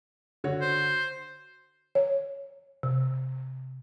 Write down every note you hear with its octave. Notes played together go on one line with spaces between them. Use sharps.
D3 F#4 C#5
C5
C#5
C3